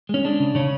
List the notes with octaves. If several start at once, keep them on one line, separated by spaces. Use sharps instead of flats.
G#3 C#4
G#3 D4
C#3
C#3 C#4